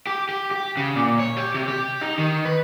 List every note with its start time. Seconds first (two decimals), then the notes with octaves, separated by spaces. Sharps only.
0.07 G4
0.29 G4
0.51 G4
0.77 C#3
0.96 A#2
1.19 C#5
1.37 G4
1.54 C3
1.68 G4
2.01 D#4
2.18 D#3
2.45 B4